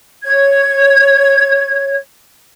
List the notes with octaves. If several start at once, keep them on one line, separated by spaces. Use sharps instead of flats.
C#5 G#6